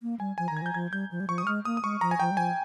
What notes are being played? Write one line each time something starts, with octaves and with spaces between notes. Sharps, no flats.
A#3
G3 G#5
F3 G#5
D#3 A#5
G#6
F3
G6
F3 G#6
G3 G6
F3
G3
F3 C#6
D#6
G3
G#3 F6
A#3 D#6
D#6
G#3 C#6
F3 A#5
G#5
F3 G5
G3
F3 G#5